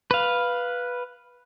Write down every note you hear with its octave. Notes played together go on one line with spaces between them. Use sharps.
B4 F5